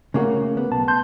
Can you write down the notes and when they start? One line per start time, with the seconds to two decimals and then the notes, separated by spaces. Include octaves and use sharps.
0.14 C#3 A3 A#3 F#4
0.57 B3
0.71 B1 B2 A5
0.88 A5 C6 G6